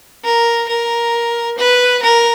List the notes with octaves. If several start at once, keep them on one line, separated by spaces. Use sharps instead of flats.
A#4
A#4
B4
A#4